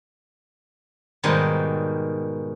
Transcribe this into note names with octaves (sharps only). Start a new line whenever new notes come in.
G#2 B2 D#3 G3